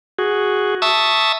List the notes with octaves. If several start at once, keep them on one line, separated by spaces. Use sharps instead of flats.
F#4 G#4
E5 A5 C#6 D#6 E6